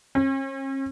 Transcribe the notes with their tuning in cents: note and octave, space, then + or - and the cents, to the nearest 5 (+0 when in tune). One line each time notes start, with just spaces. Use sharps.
C#4 -45